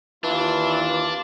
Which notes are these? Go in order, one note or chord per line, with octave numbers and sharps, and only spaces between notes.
D#2 E3 D4 F4